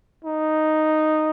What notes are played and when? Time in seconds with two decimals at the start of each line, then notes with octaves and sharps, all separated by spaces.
0.25 D#4